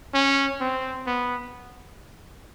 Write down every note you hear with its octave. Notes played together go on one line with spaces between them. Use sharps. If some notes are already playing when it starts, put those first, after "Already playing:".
C#4
C4
B3